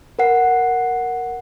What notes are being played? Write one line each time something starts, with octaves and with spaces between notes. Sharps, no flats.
A#4 B4 F#5 C7